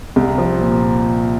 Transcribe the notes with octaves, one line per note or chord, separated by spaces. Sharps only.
C2
F3
A#2